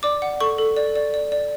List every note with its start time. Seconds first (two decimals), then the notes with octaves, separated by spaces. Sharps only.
0.03 D5 D6
0.22 F#5
0.40 A4 C#6
0.58 A4
0.76 D5
0.96 D5
1.14 D5
1.32 D5